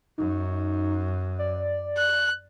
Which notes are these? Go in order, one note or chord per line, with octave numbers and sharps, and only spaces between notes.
F#2 D#4
D5
F#6